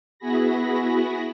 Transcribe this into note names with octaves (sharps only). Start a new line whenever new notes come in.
B3 E4 F#4 G#4 B5 A#6